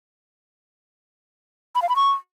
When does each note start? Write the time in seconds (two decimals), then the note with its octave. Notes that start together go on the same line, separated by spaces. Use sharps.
1.75 B5
1.82 F5
1.89 B5
1.96 C#6